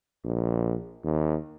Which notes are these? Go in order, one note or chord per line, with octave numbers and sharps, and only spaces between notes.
A#1
D#2